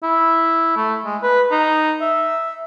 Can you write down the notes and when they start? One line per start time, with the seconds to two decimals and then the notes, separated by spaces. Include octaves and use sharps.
0.03 E4
0.77 A3
1.05 G#3
1.23 B4
1.51 D#4
2.01 E5